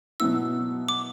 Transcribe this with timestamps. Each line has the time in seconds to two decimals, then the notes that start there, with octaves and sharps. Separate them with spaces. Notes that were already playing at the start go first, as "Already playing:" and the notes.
0.20 B2 F#3 B3 E4 E6
0.89 D6